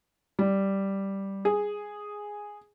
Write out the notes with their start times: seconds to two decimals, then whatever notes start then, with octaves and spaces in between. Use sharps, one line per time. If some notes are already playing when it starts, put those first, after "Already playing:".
0.39 G3
1.45 G#4